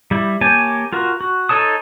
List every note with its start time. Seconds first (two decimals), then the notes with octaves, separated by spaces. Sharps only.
0.11 G3 E4
0.41 A#3 G4 C#5 G#5 A5
0.93 F4 F#4 A#4
1.21 F#4
1.49 D#4 A4 C#5 A5 D#6